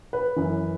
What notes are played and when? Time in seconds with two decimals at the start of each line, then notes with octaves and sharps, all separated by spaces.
0.13 B4
0.36 F#2 E3